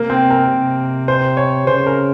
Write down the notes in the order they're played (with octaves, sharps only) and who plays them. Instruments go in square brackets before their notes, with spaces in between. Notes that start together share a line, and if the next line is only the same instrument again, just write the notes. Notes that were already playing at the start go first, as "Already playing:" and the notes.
Already playing: [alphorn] C3 [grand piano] A#3
[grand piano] C4
A#4
[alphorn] C3
[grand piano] C5
C#5
[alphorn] C#3 [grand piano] C5
[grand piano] A#4